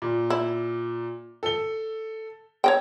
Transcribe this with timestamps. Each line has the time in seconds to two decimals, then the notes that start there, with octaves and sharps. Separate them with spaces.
0.02 A#2
0.30 E4
1.43 A4 G7
2.64 C#5 D#5 G5